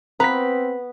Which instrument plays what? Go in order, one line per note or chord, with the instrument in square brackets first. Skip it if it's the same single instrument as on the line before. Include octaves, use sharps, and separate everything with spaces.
[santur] B3 [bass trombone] C4 [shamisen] F4 A#5 [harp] B4 B6